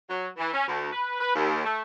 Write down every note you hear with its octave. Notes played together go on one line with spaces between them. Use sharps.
F#3
E3
C#4
D2
B4
B4
D#2
A3